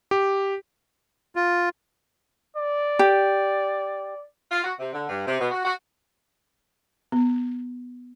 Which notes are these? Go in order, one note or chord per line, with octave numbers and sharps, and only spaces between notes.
G4
F4
D5
G4
F4
F#4
C3
D3
G2
C3
B2
F#4
F#4
B3